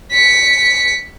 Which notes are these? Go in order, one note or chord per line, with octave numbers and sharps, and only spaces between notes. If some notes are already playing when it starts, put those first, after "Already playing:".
B6 C#7